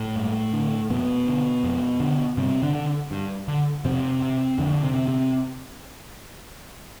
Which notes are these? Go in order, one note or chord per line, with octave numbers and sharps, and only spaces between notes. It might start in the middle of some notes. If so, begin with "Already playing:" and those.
Already playing: A2 A3
G2
D3
F2 B2 B3
D3
F2
D3
G2 C3 C4
D3 D4
D3
G2
D3
F2 C3 C4
C3
F2 D3 D4
C3 C4
C3
C3 C4